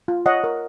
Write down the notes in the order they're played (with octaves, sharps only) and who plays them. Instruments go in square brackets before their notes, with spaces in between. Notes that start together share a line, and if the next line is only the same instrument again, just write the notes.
[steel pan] F4
C#5 D#5 F#5
A#4